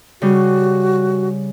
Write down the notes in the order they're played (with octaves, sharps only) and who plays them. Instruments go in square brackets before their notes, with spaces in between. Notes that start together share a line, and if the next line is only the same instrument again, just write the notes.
[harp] C#3 G3 [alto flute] F#4